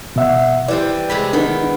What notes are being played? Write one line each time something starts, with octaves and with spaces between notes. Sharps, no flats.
B2 E5 F#5
E3 G3 C5 D5
C3 G#3 B5
D#3 B3 D4 D#4